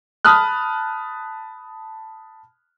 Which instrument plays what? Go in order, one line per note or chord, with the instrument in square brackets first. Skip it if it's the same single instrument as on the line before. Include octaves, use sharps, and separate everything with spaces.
[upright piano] A5 B5 D#6 F6 F#6